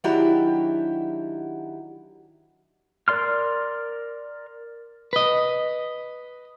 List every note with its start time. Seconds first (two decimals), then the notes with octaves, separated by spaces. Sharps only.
0.04 D#3 F#3 D4 E4 F#4 G4
3.08 A#4 D5 C6 F6
5.13 B4 D#5